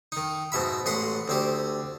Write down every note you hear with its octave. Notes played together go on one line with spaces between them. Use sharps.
D#3 D#4
G#2 B2 E5 B5
A1 G#3 F#5 B5 C6
D2 C4 G4